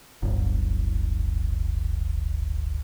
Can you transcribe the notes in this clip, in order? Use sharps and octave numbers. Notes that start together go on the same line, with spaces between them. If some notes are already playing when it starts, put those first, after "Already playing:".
D1 G1